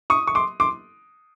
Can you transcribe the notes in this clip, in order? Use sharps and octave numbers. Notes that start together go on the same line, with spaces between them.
C#6 D#6
C#6
C6 D6
C6 D6